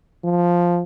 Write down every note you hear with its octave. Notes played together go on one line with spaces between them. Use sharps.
F3